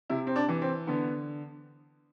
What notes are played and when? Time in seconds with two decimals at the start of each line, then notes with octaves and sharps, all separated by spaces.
0.10 C3 E4
0.27 C4
0.36 D4
0.48 E3
0.62 C4
0.87 D3 B3